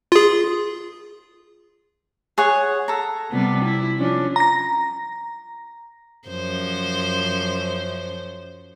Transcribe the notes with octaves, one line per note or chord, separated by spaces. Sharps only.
F4 G#4
G#4 C#5 F#5
A4 A#5
C3 G3 B3
E4
F3 C#4 D4
A#5 A#6
F#2 F3 C5